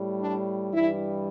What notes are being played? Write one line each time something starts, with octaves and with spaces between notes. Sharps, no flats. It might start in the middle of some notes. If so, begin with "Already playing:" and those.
Already playing: A2 G3
D4
G2 E3 G3 E4